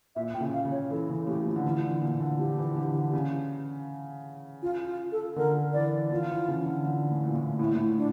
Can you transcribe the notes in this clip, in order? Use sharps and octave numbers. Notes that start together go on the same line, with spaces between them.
A#2 E5
A#2 G5
C#3
F5
C#3
C#5
E3 A4
C#3
A2 G4
F3
D3
E3 F4
D3
A#2 F4
D3
F3 G4
E3
D3
D3
C#3
F4
F4
A4
D3 A#4
E3 D5
F3 F4
E3
C#3
D3
D3
A2
A#2
A2
A2 E4
A#2
A2
D4